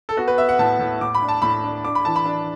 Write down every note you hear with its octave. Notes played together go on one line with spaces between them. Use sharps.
A4
B3 F#4
B4
B3 E5
F#5
A2 A5
A2
A2 D6
B5
D4
A5
A2 B5
D4
D4 D6
B5
E3 A5
B5
D4